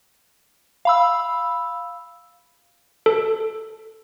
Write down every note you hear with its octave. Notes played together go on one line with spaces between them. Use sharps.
F5 B5 E6
A4